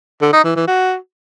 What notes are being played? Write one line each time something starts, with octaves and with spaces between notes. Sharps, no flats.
D3
D#4
E3
E3
F#4